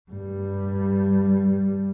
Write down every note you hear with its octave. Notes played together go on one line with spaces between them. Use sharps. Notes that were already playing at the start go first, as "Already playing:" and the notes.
G2 G3